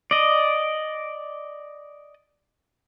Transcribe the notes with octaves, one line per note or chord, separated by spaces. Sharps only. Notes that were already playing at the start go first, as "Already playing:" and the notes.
D5 D#5